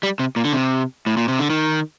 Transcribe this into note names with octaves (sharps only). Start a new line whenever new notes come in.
G3
C3
A#2
D3
C3
A2
A#2
C3
D3
D#3